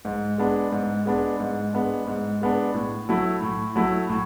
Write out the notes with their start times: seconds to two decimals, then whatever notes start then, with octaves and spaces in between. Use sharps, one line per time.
0.05 G#2
0.38 G#3 B3 D4
0.72 G#2
1.06 G#3 B3 D4
1.40 G#2
1.73 G#3 B3 D4
2.07 G#2
2.42 G#3 B3 D4
2.74 A2
3.09 F#3 A3 E4
3.43 A2
3.76 F#3 A3 E4
4.09 A2